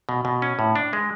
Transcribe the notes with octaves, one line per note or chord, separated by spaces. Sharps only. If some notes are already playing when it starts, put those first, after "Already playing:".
B2
B2
C#4
A2
D4
G#3